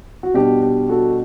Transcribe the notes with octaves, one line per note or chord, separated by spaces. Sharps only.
F#4
B2 G3 D4 G4
G4
F#4 A4